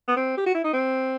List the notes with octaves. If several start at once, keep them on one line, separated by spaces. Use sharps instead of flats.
B3
C4
G4
F#4
E4
D#4
C4